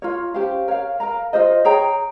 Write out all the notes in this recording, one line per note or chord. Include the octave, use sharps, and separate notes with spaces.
F4 A#4 C#5
C#4 G4 C5 F5
A#4 C#5 F5
A#4 F5 A#5
F4 G#4 C5 D#5
G#4 C#5 G5 A#5